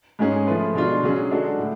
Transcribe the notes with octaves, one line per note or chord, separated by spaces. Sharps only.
G#2 G#3 C#4 G#4
F3 A3 F4 B4
B2 G#3 D4 F4
D3 F#3 C#4 G#4
G#3 D4 F#4 A4
A2